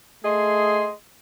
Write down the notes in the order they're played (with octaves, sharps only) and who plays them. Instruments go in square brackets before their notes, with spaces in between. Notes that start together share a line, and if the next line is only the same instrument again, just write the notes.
[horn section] A3 G#4 D#5 C6